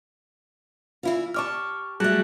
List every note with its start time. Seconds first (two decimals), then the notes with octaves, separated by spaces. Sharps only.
1.03 E3 E4 F4
1.34 G4 D#5 A5 C#6 D6 F6
2.00 F#3 G3 A3 F#4 G#4 A5